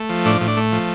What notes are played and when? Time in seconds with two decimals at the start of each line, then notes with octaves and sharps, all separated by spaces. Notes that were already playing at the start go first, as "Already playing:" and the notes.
Already playing: A3
0.10 F3
0.25 A2 D4
0.41 A2
0.48 D4
0.57 A3
0.72 F3